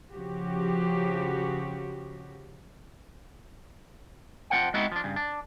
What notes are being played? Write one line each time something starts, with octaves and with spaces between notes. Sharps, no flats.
C#3 F3 F#4 G4
F2 F3 A3 C5 F#5 G5
G#3 B3 C4 D#4 E4 F#4
F3 D4
G2 C#3
D4